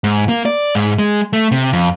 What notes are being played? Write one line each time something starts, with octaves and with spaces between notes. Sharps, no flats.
G#2
A#3
D5
G#2
G#3
A3
C3
F2